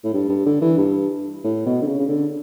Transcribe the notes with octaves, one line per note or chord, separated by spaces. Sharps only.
A2
G2
G2
D3
E3
G2
A2
B2
D3
C#3
C#3
D3